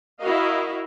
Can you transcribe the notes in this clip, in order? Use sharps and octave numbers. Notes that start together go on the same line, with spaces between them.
E4 F#4 A#4 D#5 F5